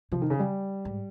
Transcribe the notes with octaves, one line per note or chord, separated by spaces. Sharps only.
C3 F3
D#3
C#3
G3
G#2